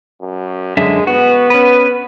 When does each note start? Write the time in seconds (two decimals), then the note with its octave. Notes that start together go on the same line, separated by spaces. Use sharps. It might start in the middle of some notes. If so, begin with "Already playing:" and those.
0.21 F#2
0.77 F#2 D3 G#3 E5
1.07 B3 F#4
1.50 C#4 B4